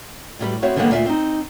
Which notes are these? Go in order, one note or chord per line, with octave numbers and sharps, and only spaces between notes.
A2 F#3 G3 B4
B3 C4 F#4 C#5 E5
D3 D#3 G3 G#3 A#3 B3
D2 A#2 F4 D5 E5
C4 D#4